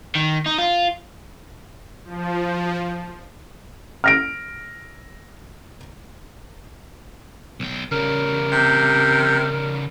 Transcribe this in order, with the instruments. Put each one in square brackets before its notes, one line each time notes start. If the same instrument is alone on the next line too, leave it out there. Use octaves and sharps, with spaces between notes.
[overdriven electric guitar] D#3
D#4
F4
[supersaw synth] F3
[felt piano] F6 A#6 D7
[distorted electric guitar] B1 G5
[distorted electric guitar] C#3 G3 [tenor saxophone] A#4
[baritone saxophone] C3